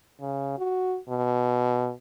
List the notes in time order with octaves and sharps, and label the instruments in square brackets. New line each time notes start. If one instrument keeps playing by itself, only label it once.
[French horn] C#3
F#4
B2